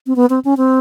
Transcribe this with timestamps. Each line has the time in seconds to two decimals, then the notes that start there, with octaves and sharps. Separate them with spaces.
0.07 C4
0.16 B3
0.30 C4
0.45 C#4
0.57 C4